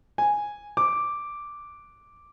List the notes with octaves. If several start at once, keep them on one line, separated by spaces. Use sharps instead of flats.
G#5
D6